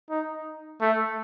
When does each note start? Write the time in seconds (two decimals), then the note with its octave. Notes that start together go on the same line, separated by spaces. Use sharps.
0.10 D#4
0.81 A3